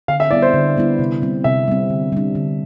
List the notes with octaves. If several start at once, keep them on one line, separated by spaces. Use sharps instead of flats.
D3 F5
E5
G3 B3 E4 D5
C5
D3
G3 B3 E4
C3
G3 C4
C3 E5
G3 C4
D3
G3 D4
D3